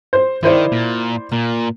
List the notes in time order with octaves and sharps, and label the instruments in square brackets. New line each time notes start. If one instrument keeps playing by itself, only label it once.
[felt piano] C5
[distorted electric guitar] D#3 [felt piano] E4 C5 D5
[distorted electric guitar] A#2
A#2